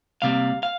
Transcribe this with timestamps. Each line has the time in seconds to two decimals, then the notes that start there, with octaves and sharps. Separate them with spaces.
0.22 C2 C3 G3 A#3 F5
0.63 F5